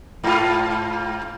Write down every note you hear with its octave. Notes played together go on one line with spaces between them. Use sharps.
G#2 F4